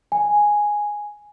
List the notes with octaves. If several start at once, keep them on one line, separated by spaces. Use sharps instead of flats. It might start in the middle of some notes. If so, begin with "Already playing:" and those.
G#5